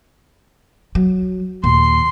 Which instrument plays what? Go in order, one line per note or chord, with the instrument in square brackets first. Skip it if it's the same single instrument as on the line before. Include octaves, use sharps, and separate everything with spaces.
[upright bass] F#3
[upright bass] D#2 A#2 [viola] C6